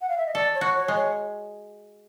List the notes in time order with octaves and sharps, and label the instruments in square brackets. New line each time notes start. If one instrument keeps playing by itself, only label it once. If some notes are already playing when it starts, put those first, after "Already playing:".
[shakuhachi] F#5
F5
E5
D#5
[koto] A4 [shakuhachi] D5
[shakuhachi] C#5
[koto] F#4
[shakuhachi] C#5
[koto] G#3
[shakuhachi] C#5